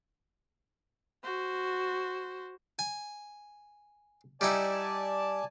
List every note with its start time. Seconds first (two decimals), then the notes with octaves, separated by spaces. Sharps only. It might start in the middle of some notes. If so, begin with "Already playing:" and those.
1.23 F#4 C5
2.79 G#5
4.41 G3 D#4 E4 D5 G#5 A5